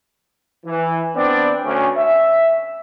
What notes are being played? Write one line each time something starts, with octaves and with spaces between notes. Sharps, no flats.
E3
B3 C4 D4 D5
D2 C#4
E5